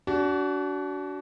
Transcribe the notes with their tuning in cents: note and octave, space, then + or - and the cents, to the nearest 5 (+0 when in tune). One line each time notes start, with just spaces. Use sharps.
D4 -30 F#4 +20